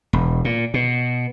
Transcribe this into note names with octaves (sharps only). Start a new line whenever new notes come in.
E1
A#2
B2